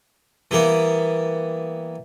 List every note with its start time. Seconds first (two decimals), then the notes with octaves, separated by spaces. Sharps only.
0.51 E3 G3 A#3 B3